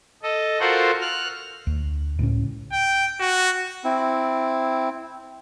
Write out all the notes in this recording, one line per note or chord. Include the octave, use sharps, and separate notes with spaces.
A4 D#5
F4 F#4 A4 A#4 C5 F#5
F6 F#6
D2
C#2 A2 C#3 C#4
G5
F#4
C4 E4